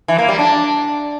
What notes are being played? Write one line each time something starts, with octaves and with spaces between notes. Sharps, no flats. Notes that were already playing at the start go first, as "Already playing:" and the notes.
E3
A#3
G3
D4